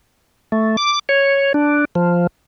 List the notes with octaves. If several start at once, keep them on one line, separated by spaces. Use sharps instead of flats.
A3
D6
C#5
D4
F3